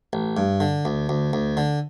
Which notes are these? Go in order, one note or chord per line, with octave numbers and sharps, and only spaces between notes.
A1
G2
D3
D2
D2
D2
D3